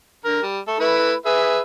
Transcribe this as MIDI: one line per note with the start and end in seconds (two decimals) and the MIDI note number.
0.25 0.42 50
0.25 0.42 70
0.42 0.59 55
0.68 0.77 57
0.68 0.77 69
0.80 1.13 57
0.80 1.13 64
0.80 1.13 71
1.26 1.60 68
1.26 1.60 71
1.26 1.60 76